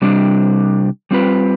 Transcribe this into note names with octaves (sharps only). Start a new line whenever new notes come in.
C3 G3 D4
G3 C4 F4 B4